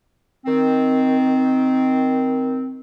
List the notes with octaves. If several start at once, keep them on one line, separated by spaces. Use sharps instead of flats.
D#3 C4